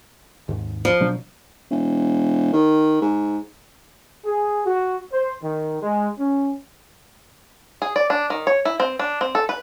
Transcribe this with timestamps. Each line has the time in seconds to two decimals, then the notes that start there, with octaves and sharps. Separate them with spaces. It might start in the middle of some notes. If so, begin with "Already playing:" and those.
0.49 D#2 G#2
0.85 F3
1.00 B2 F#3 D4
1.71 E1
2.53 D#3
3.02 G#2
4.25 G#4
4.66 F#4
5.12 C5
5.43 D#3
5.82 G#3
6.19 C#4
7.82 G#4
7.96 D5
8.10 D4
8.30 D#3
8.47 C#5
8.65 E4
8.80 C4
8.99 D4
9.21 C4
9.35 A4
9.49 B4